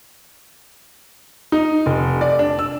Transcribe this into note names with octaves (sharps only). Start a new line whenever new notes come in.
D#4
F1
D5
D4
E6